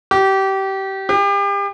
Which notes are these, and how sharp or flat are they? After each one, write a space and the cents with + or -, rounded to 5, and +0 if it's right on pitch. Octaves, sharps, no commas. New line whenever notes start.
G4 -25
G4 +35